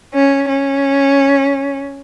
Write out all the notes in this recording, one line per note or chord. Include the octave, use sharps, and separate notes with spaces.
C#4
C#4